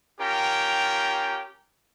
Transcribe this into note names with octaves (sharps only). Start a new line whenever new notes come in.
C#4 F4 G4 A#4 G5